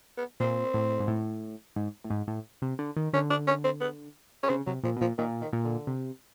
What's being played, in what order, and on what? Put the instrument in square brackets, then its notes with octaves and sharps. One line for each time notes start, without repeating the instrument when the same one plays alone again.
[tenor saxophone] B3
[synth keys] A#2 [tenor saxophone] C4
[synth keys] A2
G#2
A2
G#2
A2
G#2
A2
C3
D3
D#3
[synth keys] D3 [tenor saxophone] C#4
[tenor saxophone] D4
C#4
C4
B3
C#4
[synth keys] C#3 [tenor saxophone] C4
[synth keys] C3 [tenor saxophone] F#3
[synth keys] A#2 [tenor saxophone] F3
[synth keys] B2
[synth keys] A#2 [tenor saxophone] F3
[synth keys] A#2 [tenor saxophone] D#3
[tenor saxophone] D#3
[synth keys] A#2
[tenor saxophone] D3
[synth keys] C3